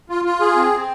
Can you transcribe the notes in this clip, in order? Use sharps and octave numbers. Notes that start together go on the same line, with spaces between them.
F4
F4
G#4
C4
C4